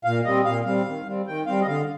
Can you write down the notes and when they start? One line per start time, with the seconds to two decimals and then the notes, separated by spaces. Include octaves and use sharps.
0.04 A#2 F5
0.24 G3 C4 D#5
0.45 A#2 F5
0.65 G3 C4 F5
0.85 D#3
1.06 G3 C4
1.27 D#3 G5
1.46 G3 C4 F5
1.61 D#5
1.67 D3 F5